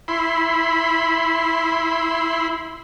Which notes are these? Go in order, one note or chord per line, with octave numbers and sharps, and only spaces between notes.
E4 B5 C6